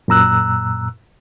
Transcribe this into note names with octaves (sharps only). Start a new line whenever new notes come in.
F#2 A#2 A#5 E6 F#6